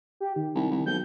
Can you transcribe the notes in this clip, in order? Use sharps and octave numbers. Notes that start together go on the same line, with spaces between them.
G4
D#3
C2
C2
B1 G6